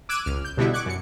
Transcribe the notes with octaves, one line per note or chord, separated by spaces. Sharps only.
D6 E6 F#6 G#6 D7 D#7
C#2 F6
G6
B2 D3 G3 B3 E4
C#6 D6 F#6 G#6
F#2 C#7